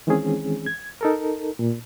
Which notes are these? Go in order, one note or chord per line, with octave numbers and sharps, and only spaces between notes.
D#3 E3 G#3 C4 C#4 G#4
G#6
D#4 A4 A#4
A#2